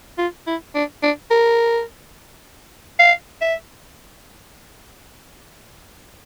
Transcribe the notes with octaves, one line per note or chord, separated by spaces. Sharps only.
F4
E4
D4
D4
A#4
F5
E5